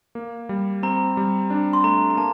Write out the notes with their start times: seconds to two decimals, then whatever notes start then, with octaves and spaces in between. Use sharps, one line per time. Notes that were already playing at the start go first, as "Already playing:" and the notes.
0.15 A#3
0.49 G3
0.83 C4 A#5
1.17 G3
1.50 D4
1.73 C6
1.84 A3 A#5
2.10 A#5
2.17 A#3 A5